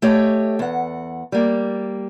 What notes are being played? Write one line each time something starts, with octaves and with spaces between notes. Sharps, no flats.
A3 G4 C#5 D#5
E2 F#5
G3 A#3